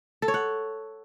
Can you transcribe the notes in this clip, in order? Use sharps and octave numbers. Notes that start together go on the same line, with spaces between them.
A4
C#5
F#5